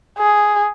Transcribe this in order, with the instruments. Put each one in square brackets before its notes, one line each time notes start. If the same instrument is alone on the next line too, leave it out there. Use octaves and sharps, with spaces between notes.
[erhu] G#4